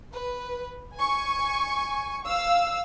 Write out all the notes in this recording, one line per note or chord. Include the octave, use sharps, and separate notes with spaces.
B4
G#5 C#6
F5 E6